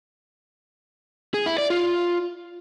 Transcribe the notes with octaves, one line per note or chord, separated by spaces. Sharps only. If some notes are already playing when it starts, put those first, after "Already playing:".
G#4
E4
D5
F4